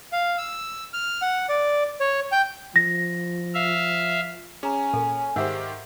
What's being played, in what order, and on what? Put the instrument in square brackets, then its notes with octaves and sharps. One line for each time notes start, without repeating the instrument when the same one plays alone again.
[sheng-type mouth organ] F5
E6
F6
F#5
D5
C#5
G5
[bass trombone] F3 [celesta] A#6
[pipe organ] E5 F5
[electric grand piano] C#4 [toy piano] G#4 A#5 [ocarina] G#5
[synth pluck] A#2 [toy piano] A4
[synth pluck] G#2 [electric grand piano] D#3 G4 C5 [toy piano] E5 F#5 E6